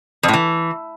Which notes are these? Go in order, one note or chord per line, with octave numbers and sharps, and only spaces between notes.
F2
A2
E3